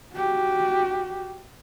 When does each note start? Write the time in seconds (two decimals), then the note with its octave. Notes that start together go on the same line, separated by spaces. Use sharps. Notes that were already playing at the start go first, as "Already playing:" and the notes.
0.13 F#4 G4